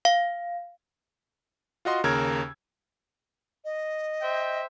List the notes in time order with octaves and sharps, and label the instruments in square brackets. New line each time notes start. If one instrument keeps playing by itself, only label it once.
[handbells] F5
[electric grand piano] F4 F#4 D#5 C6
D#2 C#3 A#4 E6 G#6
[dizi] D#5
[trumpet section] C5 E5 G5